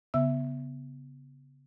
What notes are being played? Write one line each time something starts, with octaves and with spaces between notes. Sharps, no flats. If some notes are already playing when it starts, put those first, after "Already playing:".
C#3 B3 E5 E6